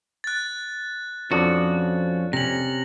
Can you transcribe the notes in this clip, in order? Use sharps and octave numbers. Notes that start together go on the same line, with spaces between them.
F#6 A6
F2 F3 C#4 D4 F#4
C3 C#4 A#6 F#7